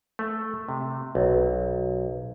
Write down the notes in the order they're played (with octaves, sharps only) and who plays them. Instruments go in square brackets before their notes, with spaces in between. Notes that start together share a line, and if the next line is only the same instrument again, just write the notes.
[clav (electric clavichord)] A3
C3
B1